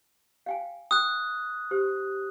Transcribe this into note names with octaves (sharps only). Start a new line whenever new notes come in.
F5 G5 G#5
G5 D#6 F#6
G4 C5